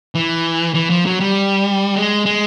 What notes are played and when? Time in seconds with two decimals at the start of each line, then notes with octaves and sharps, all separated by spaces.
0.15 E3
0.74 E3
0.90 F3
1.06 F#3
1.20 G3
1.96 G#3
2.26 G#3